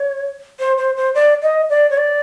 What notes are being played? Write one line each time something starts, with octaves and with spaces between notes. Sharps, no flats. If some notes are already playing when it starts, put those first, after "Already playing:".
Already playing: C#5
C5
C5
C5
D5
D#5
D5
C#5
D5